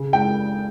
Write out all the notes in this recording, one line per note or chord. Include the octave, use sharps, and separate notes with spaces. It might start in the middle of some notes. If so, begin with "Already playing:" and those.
Already playing: C#3
G#3 G5